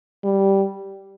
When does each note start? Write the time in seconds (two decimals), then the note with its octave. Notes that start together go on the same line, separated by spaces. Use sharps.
0.24 G3